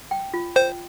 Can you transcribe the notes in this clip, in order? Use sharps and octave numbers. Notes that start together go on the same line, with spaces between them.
G5
F4
C5 G5